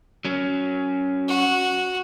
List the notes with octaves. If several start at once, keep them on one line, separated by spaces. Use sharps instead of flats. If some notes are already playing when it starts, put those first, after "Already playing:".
F#3 C#4
F#4